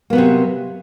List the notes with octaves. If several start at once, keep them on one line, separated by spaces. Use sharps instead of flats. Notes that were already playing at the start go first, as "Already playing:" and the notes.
C3 F#3 A#3 B3